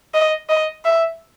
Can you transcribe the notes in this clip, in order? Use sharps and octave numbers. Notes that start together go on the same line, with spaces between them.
D#5
D#5
E5